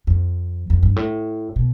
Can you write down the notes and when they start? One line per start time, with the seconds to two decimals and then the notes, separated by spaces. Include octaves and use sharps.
0.07 F2
0.70 F2
0.83 G2
0.96 A2
1.56 B2